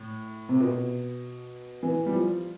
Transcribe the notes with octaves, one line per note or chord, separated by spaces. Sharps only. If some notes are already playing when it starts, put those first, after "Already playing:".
Already playing: A2
C3
B2
E3
G3
F3